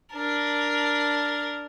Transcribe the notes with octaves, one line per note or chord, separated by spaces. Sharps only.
D4 A#4